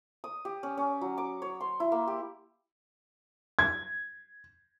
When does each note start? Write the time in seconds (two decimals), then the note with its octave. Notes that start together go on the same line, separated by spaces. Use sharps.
0.24 D#6
0.45 G4
0.63 C#4
0.77 C#4
1.01 F#3
1.18 D6
1.42 C#5
1.61 C6
1.80 E4
1.92 A#3
2.07 G4
3.59 G#6